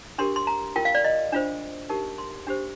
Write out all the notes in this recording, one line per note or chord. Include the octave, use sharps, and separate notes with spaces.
D4 G4 A#4 C6
C6
A#5
F4 A#4 G5
F5
D5
D#5
D4 F4 C5
D#4 G4 A#4
C6
D4 G4 C5